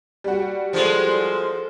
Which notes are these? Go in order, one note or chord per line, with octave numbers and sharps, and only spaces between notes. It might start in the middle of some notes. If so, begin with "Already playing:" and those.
G3 F#4
F3 G#3 A4 C5